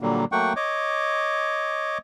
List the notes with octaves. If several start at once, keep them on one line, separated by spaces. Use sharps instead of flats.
A#2 D3 F#3 G3 A#3
F#3 A3 A#3 F#5 G5 C#6
C#5 D#5 D6